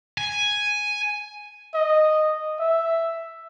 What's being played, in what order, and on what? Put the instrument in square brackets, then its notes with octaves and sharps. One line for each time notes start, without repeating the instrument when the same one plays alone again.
[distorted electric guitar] G#5
[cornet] D#5
E5